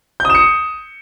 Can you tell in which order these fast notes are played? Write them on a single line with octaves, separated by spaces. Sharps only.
G6 D#6 E7 C#7